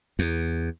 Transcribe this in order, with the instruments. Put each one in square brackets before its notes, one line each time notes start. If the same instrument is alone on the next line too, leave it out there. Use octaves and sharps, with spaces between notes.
[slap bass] E2